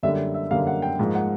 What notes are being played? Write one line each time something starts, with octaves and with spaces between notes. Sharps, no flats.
F#2 D3 G3 A#3 E5
E5
F#2 D3 G3 A#3 F5
F#5
G5
G#2 F3 A#3
F#5